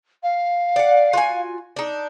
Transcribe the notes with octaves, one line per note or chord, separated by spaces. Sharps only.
F5
D5 F#5
F4 F#4 G#5
D4 D#4